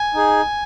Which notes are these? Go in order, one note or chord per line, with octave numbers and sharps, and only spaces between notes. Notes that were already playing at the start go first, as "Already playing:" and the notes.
Already playing: G#5
D#4 G#4